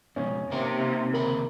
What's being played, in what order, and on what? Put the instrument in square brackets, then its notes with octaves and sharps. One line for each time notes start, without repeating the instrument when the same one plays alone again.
[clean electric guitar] F2 G#2 B2 [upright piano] C#4
[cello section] C3 [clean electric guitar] A#3 D#4 A#4
[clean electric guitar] D#2 C#3 B5 [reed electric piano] A#4